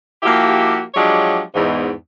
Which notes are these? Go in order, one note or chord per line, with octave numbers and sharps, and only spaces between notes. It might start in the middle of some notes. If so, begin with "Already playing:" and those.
F3 A#3 E4 F#4 G4
F3 F#3 G#3 D4 G4 C#5
E2 G#2